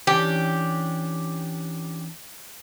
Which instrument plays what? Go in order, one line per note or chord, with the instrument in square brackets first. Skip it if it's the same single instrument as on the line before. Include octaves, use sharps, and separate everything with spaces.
[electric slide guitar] E3 C#4 D4 [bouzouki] G4